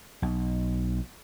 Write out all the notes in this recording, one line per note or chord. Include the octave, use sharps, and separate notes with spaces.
B1